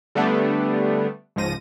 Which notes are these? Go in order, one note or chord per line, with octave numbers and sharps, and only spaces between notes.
D3 G3 A3 B3 D4
C#2 G#2 F3 A#6 D#7